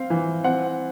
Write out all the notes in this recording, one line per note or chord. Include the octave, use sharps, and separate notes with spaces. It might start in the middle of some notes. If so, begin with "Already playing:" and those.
Already playing: C4 F5
E3
C4 F#5